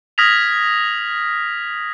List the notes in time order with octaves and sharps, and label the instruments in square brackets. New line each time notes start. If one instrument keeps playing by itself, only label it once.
[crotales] D#6 F6 G#6 A#6 B6 F7